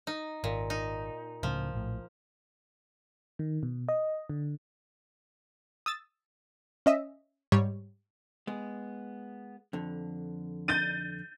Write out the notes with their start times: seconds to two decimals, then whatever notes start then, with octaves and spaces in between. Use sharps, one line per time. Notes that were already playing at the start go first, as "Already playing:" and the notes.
0.07 D#4
0.44 G#1 A#2
0.70 D#4
1.43 C#2 A2 C#3 F3
1.74 A#1 A2
3.39 D#3
3.63 B2
3.88 D#5
4.29 D3
5.86 D#6 E6 A6
6.86 C#4 D#5 E5
7.52 G#2 G3 C#5
8.47 G#3 B3
9.73 F2 D3
10.68 G6 A6 D#7